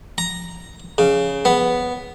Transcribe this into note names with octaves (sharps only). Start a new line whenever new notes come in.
A#5
C#3
B3